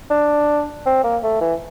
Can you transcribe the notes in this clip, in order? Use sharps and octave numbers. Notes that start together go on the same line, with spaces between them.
D4
C4
A#3
A3
E3